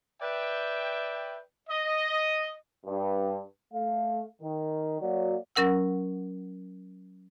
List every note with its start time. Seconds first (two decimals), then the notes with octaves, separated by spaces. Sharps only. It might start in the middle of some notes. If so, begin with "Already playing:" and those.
0.20 B4 D5 E5 G5
1.69 D#5
2.86 G2
3.73 A3 F5
4.42 D#3
5.01 F#3 A#3 F#4 C#5 D5
5.56 F#3 C#4 A#4 F#5 E6